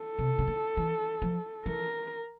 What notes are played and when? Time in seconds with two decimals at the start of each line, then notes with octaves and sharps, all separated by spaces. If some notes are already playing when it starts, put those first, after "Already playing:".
Already playing: A4
0.19 C3
0.39 C#3
0.47 D3
0.77 E3
1.22 F3
1.66 E3 A#4